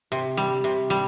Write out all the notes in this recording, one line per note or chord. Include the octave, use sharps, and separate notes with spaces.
C3
G3
C3
G3